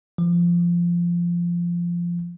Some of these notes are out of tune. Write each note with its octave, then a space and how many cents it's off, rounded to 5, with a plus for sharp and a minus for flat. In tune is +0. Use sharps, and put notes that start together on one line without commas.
F3 -15